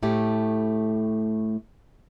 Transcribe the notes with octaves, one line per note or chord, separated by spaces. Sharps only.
A2 A3 G4